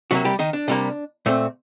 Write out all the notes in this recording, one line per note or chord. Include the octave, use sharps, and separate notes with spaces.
C3 F#3 G3 A#3 F#4
G3 G4
D#3 D#4
D4
C3 G3 A#3
A#2 A3 C4